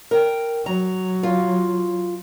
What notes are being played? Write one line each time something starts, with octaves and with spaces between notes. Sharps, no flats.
A#4 G5
F#3 A#5
F4